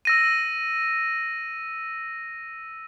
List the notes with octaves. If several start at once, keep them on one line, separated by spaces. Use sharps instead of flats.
E6 A#6 D#7